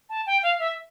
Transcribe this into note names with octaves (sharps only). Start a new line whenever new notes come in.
A5
G5
F5
E5